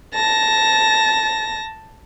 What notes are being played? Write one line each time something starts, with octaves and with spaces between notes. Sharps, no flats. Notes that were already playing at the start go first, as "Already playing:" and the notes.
A5 A#6